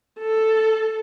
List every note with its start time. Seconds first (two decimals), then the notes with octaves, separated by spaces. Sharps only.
0.20 A4